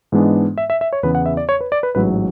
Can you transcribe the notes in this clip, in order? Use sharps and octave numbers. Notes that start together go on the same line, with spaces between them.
G#2 E3 G#3 B3 D4
E5
E5
E5
C#5
E2 C#3 E3 B3 E4 B4
F#5
E5
D5
C#5
B4
D5
B4
A1 G#2 F#3 B4